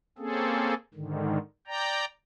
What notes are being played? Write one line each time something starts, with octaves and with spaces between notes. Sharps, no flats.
A#3 C4 C#4 G#4 A4
G#2 D3 D#3
D5 G5 A#5